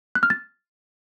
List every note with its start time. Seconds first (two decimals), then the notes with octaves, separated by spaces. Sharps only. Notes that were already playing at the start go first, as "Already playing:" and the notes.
0.15 F#6
0.23 F6
0.30 A6